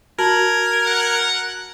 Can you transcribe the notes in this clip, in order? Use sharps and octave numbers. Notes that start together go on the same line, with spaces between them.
F#4 A#4 A5 G#6 F#7
F#5